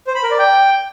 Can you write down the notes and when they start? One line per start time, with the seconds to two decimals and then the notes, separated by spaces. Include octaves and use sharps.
0.07 C5
0.15 B5
0.23 A#4
0.31 D5
0.39 G5